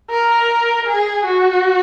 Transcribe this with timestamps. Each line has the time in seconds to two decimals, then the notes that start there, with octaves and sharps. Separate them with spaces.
0.10 A#4
0.87 G#4
1.25 F#4